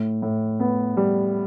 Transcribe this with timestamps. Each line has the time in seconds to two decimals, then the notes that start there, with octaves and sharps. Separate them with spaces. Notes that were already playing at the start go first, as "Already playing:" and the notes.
Already playing: A2
0.22 A2
0.60 B3
0.97 G3